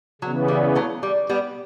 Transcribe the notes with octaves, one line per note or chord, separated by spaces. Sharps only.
C#3 E3 F#3 B3
G3
F#3 A3
G3
G3 B3